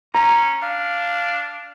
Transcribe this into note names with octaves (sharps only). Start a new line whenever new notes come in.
C#4 A#5
D4 F5